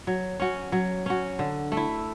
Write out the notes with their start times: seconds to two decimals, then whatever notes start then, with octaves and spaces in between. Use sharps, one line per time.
0.07 F#3
0.40 C#4 F#4
0.72 F#3
1.06 C#4 F#4
1.39 D3
1.72 A3
1.77 E4